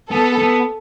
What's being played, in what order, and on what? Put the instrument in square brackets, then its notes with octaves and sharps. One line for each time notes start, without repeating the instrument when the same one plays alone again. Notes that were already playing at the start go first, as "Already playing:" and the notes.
[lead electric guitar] B3 [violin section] A4
[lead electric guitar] B3